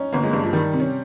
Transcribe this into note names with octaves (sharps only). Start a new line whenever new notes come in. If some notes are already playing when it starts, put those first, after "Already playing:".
Already playing: C#4 D#4
G1 A#3
G#3
G2
F3
D#3 G3
C3
C#4